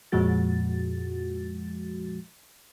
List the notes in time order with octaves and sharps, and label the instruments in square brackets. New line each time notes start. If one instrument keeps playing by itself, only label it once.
[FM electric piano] F2 A#2 F3 G#3 F#4 A6